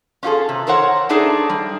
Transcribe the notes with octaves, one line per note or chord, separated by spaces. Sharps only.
C#4 D#4 F4 F#4 G#4 A4
C3
A4 A#4 C5 C#5 F#5
A3 D4 D#4 G#4 A4
G3